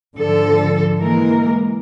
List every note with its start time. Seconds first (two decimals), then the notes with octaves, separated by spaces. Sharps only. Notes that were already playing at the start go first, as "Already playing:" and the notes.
0.16 G#2 D3 F3 A4
1.00 E3 G#3 A#3 A#4